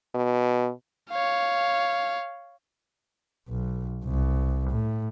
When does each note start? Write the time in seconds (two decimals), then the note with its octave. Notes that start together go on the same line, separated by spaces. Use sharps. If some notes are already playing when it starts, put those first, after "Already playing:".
0.14 B2
1.10 C#5 F5
3.48 B1
4.04 C2
4.70 A2